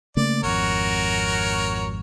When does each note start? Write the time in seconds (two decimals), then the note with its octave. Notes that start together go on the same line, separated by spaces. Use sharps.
0.17 C#3 A3 A#3 D5
0.43 G#1 F2 F#4 A#4 C#5